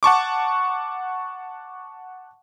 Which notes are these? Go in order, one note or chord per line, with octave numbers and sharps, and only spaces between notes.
F#5 A5 C#6 D6